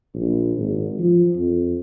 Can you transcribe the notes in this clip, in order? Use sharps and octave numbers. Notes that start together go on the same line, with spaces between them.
A#1
G#1
F3
F2